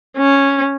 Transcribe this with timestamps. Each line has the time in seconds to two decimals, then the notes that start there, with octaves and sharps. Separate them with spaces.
0.18 C#4